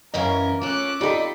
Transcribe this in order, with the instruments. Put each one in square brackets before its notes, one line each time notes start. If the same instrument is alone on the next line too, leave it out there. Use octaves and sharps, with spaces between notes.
[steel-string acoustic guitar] F#2 E3 C#4 [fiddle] A#4 [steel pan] D#5 F5
[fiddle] C#4 F#6 [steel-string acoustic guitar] F4 A4 [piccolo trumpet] D6
[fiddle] D#4 B5 [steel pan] F4 G4 A4 [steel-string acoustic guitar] D5 D#5